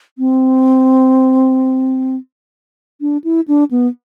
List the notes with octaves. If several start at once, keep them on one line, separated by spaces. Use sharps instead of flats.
C4
D4
E4
D4
B3